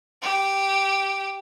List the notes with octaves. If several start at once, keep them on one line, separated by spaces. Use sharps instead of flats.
G4